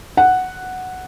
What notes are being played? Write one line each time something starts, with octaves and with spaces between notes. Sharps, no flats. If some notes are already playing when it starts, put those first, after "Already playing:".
F#5